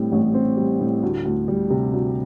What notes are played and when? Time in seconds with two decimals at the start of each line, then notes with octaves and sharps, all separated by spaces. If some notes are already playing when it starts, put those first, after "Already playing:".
Already playing: A2 G3 C4
0.12 A1
0.34 C4
0.57 G3
0.80 A2
1.03 D2
1.25 D2
1.48 G3
1.70 C3
1.93 D2